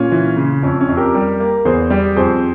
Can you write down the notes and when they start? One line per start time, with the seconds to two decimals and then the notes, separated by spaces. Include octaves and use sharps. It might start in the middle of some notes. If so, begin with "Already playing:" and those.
Already playing: A#2 C#4 F4
0.12 E3
0.37 C#3
0.62 F2 C#4
0.80 C#4
0.88 F2
0.97 G4 A#4
1.15 G3
1.40 A#3
1.65 E2 G#4 C5
1.90 G3
2.16 F2 G#4 C5